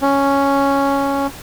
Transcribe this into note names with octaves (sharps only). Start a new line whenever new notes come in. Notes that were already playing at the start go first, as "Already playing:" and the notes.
C#4